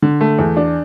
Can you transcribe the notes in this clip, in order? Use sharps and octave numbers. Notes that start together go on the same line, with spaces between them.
D3
A3
E2
D4